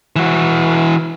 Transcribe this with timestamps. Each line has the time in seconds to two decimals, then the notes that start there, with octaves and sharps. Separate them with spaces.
0.16 E3 F#4